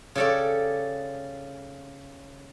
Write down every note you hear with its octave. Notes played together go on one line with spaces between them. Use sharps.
C#3 G4 A4 C#5 D5